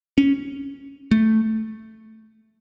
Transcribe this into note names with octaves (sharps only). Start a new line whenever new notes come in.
C#4
A3